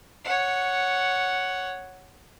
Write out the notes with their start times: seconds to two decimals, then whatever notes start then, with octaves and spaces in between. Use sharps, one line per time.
0.24 C#5 F#5